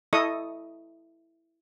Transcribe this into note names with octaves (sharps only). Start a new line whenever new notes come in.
E4 A4 D#5 C#6 D#6